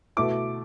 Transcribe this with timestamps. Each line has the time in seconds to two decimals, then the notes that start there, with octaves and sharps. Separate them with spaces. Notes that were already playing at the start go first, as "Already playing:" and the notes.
0.17 B2 A3 E4 D6